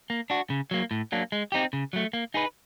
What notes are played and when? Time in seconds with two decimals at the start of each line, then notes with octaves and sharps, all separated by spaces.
0.10 A#3
0.30 D4 F#4
0.50 C#3
0.71 F#3 A#3
0.91 A2
1.12 F#3 A#3 D4
1.32 G#3
1.52 C4 D#4 G4
1.73 C#3
1.93 F#3 A3
2.13 A#3
2.34 D#4 G#4 B4